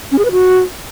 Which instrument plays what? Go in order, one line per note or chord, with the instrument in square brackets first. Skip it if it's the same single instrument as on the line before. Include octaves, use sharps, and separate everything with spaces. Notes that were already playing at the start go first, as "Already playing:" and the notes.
[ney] C#4
G#4
B4
F#4